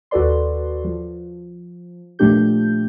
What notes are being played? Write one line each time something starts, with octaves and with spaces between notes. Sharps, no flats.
D#2 F#4 A4 B4 D5 C6
F3
A#2 F3 A3 D4 G4 G6